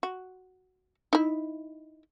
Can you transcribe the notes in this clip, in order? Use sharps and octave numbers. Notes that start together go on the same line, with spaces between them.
F#4
D#4 E4